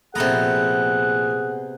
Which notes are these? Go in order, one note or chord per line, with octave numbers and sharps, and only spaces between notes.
A#1 C3 B3 G#4 A4 F#5 A#5